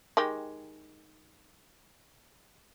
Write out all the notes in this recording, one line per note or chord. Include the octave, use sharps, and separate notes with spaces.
D#3 G#3 G4